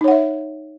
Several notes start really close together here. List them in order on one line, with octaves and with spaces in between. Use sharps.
D#4 C#5 F#5 E5